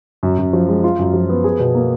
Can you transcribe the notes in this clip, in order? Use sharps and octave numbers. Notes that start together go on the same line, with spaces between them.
F#2
F#2
F3
G#3
F4
F#2
F3
B3
G#4
B2
A#3